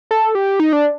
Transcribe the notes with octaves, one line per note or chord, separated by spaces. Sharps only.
A4
G4
D#4
D4